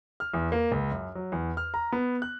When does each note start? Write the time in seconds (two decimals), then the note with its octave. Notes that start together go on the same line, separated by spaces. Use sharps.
0.20 F6
0.34 E2
0.52 A#3
0.72 C#2
0.91 F#2
1.15 F#3
1.32 E2
1.57 F6
1.74 A#5
1.92 B3
2.22 F#6